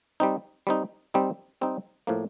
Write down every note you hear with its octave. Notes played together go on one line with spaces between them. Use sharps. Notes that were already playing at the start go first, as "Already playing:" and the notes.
G3 C4 D#4
G3 C4 D#4
G3 C4 D#4
G3 C4 D#4
A2 F3 A#3